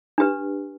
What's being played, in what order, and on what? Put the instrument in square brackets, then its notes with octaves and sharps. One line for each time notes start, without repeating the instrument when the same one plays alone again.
[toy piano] D4 G4 B4